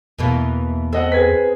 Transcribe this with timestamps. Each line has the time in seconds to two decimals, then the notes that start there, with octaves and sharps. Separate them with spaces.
0.19 E2 B2 E3 A#3
0.93 C4 A4 D#5 F#5
1.12 G#4 B4 G#6 B6